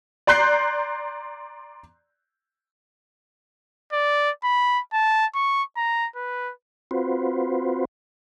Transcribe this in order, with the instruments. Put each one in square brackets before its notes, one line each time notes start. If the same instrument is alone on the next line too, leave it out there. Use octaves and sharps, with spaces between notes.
[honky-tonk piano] D5 A#5 C6 F#6 G6 C7
[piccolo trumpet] D5
B5
A5
C#6
A#5
B4
[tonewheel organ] C4 F4 F#4 B4 C5